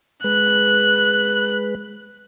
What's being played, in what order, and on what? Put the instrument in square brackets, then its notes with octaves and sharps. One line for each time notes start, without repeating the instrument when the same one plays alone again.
[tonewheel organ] G#3 B4 [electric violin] F#6